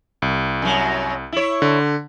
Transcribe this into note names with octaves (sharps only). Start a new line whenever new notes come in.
C2
F#2 F#3
E4 C#5
D3